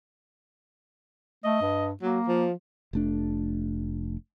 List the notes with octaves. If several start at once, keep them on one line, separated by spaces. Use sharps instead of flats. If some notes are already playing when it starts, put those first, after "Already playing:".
A3 D#5
G2
F#3 A#3
F3
F1 A3 D4